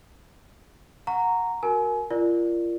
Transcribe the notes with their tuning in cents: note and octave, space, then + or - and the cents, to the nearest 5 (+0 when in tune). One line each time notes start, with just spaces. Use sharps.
F#5 -20 A#5 -10 C#6 +5
F#4 +0 A#4 +0 G#5 +30
F4 -35 A#4 +0 D5 +0